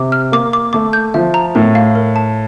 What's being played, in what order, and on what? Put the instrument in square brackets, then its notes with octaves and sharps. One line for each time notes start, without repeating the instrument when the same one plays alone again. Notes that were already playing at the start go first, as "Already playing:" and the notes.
Already playing: [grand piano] C3 [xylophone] D6
[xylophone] F6
[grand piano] A#3 [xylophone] D6
[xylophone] D6
[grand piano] A3 [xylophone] D6
[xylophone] G6
[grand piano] F3 [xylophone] E5
[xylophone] A#5
[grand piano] A2 [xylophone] A#4
[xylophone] F5
A#4
A5